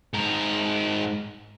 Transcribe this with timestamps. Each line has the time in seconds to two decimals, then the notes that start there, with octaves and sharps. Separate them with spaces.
0.14 G#2 A#4